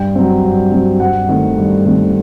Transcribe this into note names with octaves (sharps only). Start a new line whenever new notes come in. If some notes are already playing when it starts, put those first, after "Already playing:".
Already playing: G2 G5
F#3 C4
G2
F#3 C4
G2 F#5
D#3 A3 C4
G2
D#3 A3 C4